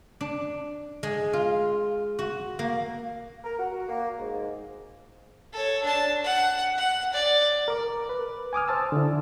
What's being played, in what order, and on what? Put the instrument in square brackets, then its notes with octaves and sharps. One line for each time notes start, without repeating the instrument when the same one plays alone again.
[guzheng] D4
G#3
F4
F#4
A#3
[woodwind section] A#4
F#4
A#3
G#2
[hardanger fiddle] A4 C#5
D4 A5
F#5
F#5
D5
[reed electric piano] A#4 D6
B4
G#5 D6 D#6 F6
C5 A5 E6
D3 E4